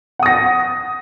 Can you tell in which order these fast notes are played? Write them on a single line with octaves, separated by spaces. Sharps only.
F#5 D#6 A#6